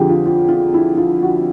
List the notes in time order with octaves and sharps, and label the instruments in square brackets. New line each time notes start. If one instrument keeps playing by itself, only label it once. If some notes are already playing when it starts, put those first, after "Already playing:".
Already playing: [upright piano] F2 D3 F3 G4 G#4
F4
F4
F4
E4
F4
F#4